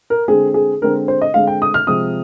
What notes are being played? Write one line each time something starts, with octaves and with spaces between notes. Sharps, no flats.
A#4
D3 G#3 C4 G#4
G#4
D3 G#3 C4 A#4
C5
D#5
D3 G#3 C4 F5
G5
D#6
F6
C3 F3 G#3 C4 D#6